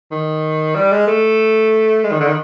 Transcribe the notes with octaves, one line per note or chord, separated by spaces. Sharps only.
D#3
G3
G#3
A3
G#3
D#3
D3
D#3